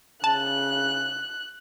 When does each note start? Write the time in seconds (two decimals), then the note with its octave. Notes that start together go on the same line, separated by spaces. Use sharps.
0.24 C#3 A5 F#6